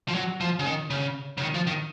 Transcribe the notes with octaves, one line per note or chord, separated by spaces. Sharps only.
F3
F#3
F3
C#3
D#3
C#3
C#3
D#3
F3
D#3